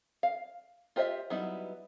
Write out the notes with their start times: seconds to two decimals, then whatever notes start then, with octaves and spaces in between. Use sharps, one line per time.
0.23 F5
0.96 F4 G4 C5 D#5 E5
1.30 F#3 G3 B3 D#4 E4